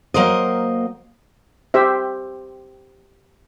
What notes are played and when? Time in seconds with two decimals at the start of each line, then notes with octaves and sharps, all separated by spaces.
0.14 F#3 A#3 A#4 C5 D#5
1.74 G4 C5 E5